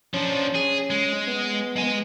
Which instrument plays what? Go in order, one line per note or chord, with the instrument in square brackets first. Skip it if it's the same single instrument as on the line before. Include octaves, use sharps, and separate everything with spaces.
[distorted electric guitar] F3 D4 [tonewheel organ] C#4
[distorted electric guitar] G#4
G#3
[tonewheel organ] B3
[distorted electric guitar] G#3 G#5